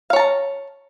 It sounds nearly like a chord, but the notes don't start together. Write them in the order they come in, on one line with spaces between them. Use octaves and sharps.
F5 C#5 A5 A#5